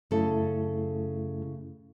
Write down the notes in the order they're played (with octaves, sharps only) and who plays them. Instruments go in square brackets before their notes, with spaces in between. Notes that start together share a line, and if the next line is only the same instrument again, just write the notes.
[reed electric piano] F#2 A3 E4 [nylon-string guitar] C#3 A4